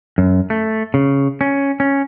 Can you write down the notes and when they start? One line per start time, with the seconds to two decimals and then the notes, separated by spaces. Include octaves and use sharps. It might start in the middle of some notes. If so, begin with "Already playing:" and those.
0.18 F#2
0.50 A3
0.94 C#3
1.41 C#4
1.80 C#4